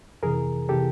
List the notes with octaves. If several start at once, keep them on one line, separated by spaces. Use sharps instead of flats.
F2 C3 E3 G#4 A#4
C3 E3 G4 A4